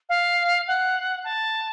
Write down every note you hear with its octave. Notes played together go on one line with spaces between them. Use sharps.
F5
F#5
A5